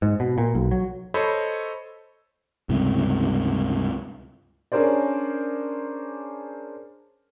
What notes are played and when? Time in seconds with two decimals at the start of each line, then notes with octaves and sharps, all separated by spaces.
0.02 G#2
0.20 B2
0.38 A#2
0.55 B1
0.71 F#3
1.14 A4 C5 C#5 D#5 B5
2.69 C#2 G2 C3
4.72 C#4 D4 G#4 A#4 C5 D5